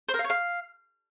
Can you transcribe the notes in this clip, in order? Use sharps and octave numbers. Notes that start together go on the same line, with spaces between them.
C5
A#4
F5
C#5
F5